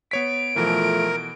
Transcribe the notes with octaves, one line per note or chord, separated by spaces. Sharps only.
B3 C#5 B6 D7
B2 E3 F3 A3 A#4